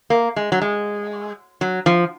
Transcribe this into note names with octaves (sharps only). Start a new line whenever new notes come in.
A#3
G#3
F#3
G#3
F#3
F3